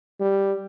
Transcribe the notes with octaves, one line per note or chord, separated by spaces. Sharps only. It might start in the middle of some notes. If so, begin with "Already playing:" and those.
G3